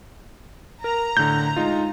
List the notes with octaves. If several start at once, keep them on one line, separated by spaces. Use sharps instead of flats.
A#4 A#5
A2 D3 G6
G#3 D#4 F4